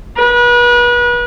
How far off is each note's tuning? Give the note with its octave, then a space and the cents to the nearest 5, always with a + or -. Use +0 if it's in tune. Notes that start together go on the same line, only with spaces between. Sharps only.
B4 -35